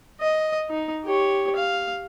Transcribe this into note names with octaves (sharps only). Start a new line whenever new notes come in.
D#5
D#4
G4 C#5
F5